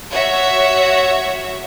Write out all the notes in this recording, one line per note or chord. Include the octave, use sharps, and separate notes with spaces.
F#4 C#5 E5